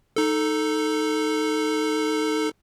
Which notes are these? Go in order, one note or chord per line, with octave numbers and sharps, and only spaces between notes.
D#4 A4